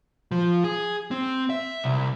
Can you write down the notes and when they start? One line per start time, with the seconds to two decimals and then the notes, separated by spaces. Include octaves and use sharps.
0.32 F3
0.64 G#4
1.11 C4
1.50 E5
1.84 C2